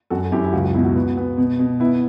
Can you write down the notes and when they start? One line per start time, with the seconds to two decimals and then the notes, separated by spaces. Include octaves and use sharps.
0.10 F#2 F#4 A4
0.32 F#2 E4 G4
0.44 E4
0.53 C#2 F#4
0.64 F#4
0.74 B2 E4
0.84 F#4
0.95 B3
1.17 B3
1.37 B2
1.59 B2
1.80 B3 E4